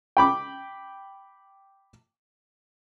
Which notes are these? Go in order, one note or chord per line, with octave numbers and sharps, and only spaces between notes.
G5 B5 D6